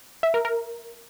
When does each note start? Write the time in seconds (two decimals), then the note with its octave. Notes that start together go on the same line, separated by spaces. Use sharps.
0.23 E5
0.34 A#4
0.45 A#4